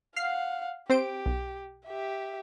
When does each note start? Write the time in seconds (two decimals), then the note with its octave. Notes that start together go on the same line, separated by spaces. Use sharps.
0.16 F5 F#5 F6 C7
0.90 C4 G4 C5 D7
1.26 B1
1.86 G4 E5